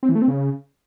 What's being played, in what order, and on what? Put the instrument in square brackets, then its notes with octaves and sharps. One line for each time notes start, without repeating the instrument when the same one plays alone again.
[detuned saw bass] C4
E3
A3
C4
C#3